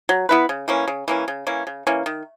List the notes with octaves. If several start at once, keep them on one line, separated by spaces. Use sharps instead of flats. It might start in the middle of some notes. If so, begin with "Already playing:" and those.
F#3
B3 E4 B4
C#3
E3 A#3 C#4
C#3
E3 A#3 C#4
C#3
E3 A#3 C#4
C#3
E3 A#3 C#4
D#3